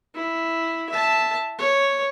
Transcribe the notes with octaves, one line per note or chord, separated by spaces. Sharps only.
E4
E5 A5
C#5